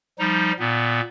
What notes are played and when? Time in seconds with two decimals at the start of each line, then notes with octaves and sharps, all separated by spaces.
0.19 F3 G3 D#4
0.60 A#2 B3